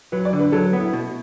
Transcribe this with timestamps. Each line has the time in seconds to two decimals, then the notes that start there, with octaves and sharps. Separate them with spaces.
0.12 F#3 B4
0.25 D5
0.33 D3
0.40 B4
0.52 F#3 A4
0.73 B3
0.80 E4
0.93 B2